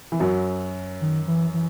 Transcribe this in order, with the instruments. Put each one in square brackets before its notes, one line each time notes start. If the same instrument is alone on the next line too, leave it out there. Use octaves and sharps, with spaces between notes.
[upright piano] E3
F#2 F#3
[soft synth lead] D#3
E3
E3